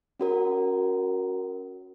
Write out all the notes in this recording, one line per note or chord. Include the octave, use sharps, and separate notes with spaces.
C#4 F#4 A#4